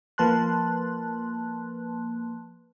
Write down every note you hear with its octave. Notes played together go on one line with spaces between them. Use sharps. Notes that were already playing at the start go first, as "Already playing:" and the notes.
F3 A#3 B4 A5 C6 F#6